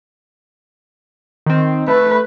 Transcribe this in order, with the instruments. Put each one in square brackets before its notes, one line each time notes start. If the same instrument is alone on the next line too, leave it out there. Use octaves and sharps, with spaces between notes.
[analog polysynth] D#3 C4
[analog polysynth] A3 [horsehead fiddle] B4